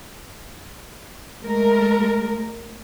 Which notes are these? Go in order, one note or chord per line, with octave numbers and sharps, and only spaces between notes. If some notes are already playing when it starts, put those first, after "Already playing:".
G#3 A3 A#4